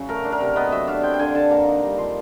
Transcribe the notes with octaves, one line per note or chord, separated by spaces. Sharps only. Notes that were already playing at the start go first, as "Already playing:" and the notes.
Already playing: C#3 F#3
A3 A#4
D4
A#4
C3
B3 D#5
F#3 E5
D4 F5
C4 G5
G5
D3 G#5
D3 A5
A#3 A#5
D#4
G3
F3 C6